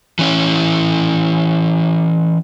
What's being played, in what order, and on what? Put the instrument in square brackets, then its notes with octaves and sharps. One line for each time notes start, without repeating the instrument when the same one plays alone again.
[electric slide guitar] E3 C#4 E4